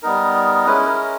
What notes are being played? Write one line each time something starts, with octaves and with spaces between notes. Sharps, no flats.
G3 B3 D#4 A#4
G#3 C#4 E4 B4
A#4